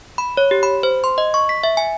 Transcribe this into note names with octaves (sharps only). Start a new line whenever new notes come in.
B5
C#5
G4
B5
C5
C6
D#5
C#6
B6
E5
G#5